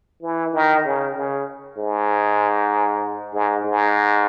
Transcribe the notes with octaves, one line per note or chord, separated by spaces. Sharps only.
E3
D#3
C#3
C#3
G#2
G#2
G#2